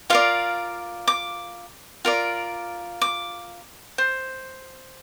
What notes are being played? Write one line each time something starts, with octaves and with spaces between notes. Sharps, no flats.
F4 A#4 D5 F5
D6
F4 A#4 D5
D6
C5